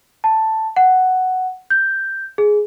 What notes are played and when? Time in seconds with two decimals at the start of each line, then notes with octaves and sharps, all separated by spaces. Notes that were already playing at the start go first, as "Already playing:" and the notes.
0.24 A5
0.76 F#5
1.70 G6
2.38 G#4